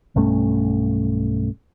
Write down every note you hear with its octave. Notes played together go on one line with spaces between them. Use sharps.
B1 G2 A3 C#4